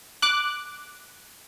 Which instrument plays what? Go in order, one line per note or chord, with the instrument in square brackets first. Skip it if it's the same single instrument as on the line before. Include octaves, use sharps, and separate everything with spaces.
[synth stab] D6 F#6